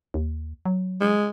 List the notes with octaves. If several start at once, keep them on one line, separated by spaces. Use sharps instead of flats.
D#2
F#3
G#3